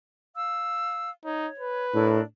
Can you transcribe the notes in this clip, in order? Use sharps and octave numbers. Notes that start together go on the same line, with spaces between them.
F5 E6
D#4 C#5
B4
A2 D4 E4 A#4